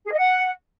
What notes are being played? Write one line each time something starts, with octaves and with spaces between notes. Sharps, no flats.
G#4
D#5
F#5